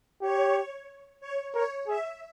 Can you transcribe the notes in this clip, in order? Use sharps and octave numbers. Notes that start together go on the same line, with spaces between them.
G4 C#5
C#5
A#4 C#5
G#4 E5